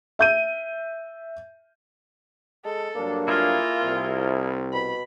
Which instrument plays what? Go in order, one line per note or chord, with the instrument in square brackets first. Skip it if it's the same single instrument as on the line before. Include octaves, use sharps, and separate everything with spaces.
[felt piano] E5 G6 D#7
[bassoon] G#3 [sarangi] A4
[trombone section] G2 F#3 D4 [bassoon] A#3
[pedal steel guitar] E4 G#4 A#4 [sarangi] F4
[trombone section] C2 C4
[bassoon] B2 [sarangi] B5